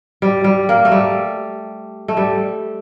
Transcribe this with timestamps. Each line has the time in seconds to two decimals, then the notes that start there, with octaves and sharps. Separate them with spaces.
0.22 G3
0.44 G3
0.69 A#3
0.85 A3
0.92 G3
2.08 A3
2.17 G3